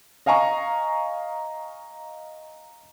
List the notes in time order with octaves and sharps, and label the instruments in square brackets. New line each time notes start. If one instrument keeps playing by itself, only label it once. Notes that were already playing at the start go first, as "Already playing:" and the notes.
[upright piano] D#5 F5 G#5 A#5 C#6